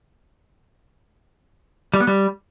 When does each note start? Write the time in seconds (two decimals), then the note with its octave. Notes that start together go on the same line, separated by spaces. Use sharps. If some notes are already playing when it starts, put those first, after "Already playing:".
1.94 G3
2.00 B3
2.07 G3